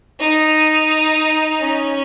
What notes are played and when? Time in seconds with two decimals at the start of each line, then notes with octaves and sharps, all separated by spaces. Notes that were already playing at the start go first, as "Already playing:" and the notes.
0.20 D#4
1.60 C#4